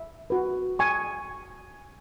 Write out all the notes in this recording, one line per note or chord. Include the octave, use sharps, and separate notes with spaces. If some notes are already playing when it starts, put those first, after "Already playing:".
Already playing: E5
F#4 B4
G#5 C#6